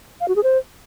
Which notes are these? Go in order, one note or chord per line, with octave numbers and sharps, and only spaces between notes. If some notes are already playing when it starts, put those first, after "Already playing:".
F5
F#4
G#4
C5